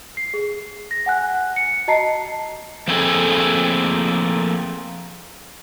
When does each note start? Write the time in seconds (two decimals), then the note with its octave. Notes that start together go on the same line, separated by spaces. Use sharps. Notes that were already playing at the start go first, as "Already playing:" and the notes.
0.17 C7
0.34 G#4
0.91 A#6
1.06 F#5 G#5 F#6
1.56 C#7
1.88 F#4 D#5 A5 A#5 C7
2.88 F3 A3 A#3 C4 G#4 A4